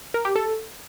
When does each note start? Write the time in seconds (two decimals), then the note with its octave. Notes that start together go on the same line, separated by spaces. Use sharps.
0.14 A#4
0.25 G4
0.36 A4